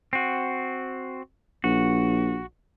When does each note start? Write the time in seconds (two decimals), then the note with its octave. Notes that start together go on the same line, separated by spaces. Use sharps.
0.13 C4 F#4
1.64 A#1 F#4